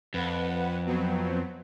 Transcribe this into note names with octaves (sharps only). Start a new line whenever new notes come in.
F2 B4 F#5
F#3 B3 C4